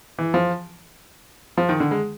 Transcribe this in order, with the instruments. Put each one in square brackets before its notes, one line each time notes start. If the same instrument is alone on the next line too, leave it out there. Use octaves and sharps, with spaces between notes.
[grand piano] E3
F3
F3
D#3
D3
G#3